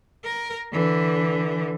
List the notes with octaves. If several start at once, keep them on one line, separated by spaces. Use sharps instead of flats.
A#4
D3 E3